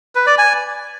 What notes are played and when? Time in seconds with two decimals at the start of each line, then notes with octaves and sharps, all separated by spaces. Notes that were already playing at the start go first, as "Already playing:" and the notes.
0.15 B4
0.27 D5
0.38 G#5